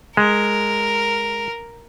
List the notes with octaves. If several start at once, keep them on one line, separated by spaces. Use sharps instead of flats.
G#3 A#4